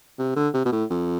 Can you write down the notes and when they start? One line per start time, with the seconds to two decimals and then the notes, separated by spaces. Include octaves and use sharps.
0.19 C3
0.36 D3
0.54 C3
0.65 B2
0.72 A2
0.90 F2